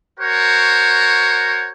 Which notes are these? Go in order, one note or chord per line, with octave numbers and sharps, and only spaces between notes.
F#4 A#4 C5 C#5